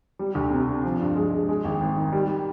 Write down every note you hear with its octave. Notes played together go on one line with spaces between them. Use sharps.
G3
D2
C3
D4
F3
G2
G#3
G#3
G#3
G#1
G#1
D#3
G3